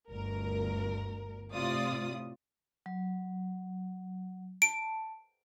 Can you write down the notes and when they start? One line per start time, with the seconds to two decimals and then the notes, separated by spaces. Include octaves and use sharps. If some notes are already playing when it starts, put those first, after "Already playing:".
0.10 G1 D2 A#4
1.53 A2 C3 F4 D5 D#6
2.86 F#3
4.62 A5 D7